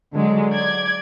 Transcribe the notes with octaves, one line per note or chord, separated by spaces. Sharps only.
D3 F#3 G#3
D5 G#6